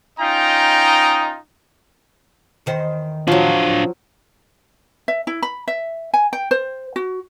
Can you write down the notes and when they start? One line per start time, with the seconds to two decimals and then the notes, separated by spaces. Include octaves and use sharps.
0.20 C#4 D#4 F4 D#5 G5 A#5
2.66 E2 D#3 C5
3.28 F3 F#3 D4 F5
5.08 E5
5.27 E4
5.42 B5
5.68 E5
6.14 G#5
6.33 G5
6.51 C5
6.96 F#4